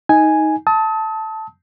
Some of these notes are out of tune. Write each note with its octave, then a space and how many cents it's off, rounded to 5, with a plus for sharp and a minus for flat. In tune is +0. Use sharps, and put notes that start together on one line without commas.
D#4 +15 G#5 +0
A5 +0 D#6 +40